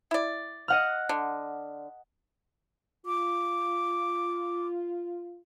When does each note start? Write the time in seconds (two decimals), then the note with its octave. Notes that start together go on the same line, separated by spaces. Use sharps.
0.11 E4 D5
0.68 D#5 F#5 F6
1.09 D3
3.06 F4 D6